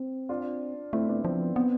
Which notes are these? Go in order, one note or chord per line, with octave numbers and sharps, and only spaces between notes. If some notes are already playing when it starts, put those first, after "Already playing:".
Already playing: C4
D4 F4
A3 C4 E4
B3 D4
F3 C4
B3
B3 C4